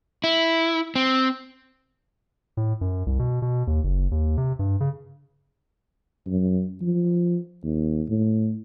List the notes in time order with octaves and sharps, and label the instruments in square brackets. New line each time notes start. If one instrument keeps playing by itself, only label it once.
[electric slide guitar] E4
C4
[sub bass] A2
F#2
C2
B2
B2
D#2
F#1
D#2
C3
G2
C#3
[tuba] F#2
F3
D#2
A2